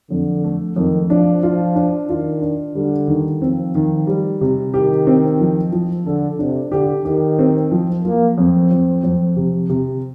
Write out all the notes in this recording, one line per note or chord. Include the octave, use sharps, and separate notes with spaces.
F2 D3
A3
F2 D#3
F3 D4
F3 F4
D4
D#3 F4
D4
D3 G3
D#3
F3 C4
D#3
G3
C3
D#3 G4
C4
F3
F3
D3 A4
C3 D4
D3 G4
D#3 G4
C4
F3
F3 A#3
F2 C4
F2
F2
C3
C3